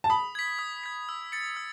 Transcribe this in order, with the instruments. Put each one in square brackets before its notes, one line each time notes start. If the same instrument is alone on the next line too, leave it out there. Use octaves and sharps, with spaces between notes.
[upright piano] A5
[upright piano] B5 [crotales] D#6
[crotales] G#6 B6
D#6
G#6 B6
E6
A6 C#7
E6